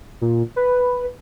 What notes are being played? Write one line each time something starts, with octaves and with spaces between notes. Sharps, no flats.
A#2
B4